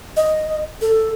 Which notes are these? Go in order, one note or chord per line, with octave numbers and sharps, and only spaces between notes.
D#5
A4